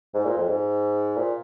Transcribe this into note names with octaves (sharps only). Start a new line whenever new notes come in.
G#2
A#2
F2
G#2
A#2